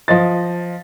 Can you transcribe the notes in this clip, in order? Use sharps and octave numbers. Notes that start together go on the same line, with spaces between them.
F3 D#5 A6